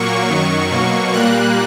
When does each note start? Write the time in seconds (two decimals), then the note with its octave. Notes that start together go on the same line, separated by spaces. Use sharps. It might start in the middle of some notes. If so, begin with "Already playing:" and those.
Already playing: A#2 F#3 A#3 C#6
0.29 F#2 D#3 F#3
0.71 B2 F#3 A#3
1.13 A#2 G3 A#3 F#6